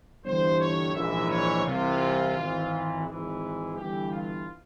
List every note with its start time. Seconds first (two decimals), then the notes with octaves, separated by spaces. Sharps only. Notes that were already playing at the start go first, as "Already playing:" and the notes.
0.24 G1 G2 E3 C5
0.59 C#5
0.95 A#1 G#2 E3 E5
1.29 C#5
1.64 C2 C3 E3 F4
2.34 G#1 G#2 E3
3.05 G#1 G#2 E3 G#4
3.76 G1 G2 E3 G4
4.10 F4